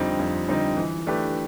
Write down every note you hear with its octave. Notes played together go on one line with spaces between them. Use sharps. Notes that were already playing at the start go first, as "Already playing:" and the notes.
Already playing: F2 D3 G3 C4 D#4
F2
D3 G3 C4 D#4
E3
A3 D4 G4 B4